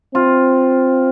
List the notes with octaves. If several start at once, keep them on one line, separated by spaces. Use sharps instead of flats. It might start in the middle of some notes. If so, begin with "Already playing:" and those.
C4 F4